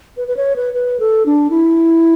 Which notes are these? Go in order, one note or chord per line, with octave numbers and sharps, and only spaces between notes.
B4
B4
C#5
B4
B4
A4
D4
E4